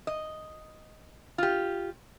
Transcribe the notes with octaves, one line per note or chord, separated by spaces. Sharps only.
D#5
F4 G4